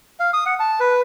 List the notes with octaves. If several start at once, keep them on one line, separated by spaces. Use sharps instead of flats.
F5
D#6
F#5
A5
B4